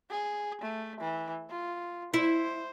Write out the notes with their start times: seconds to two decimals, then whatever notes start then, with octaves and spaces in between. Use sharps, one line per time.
0.10 G#4
0.61 A3
1.00 E3
1.50 F4
2.14 E4 C5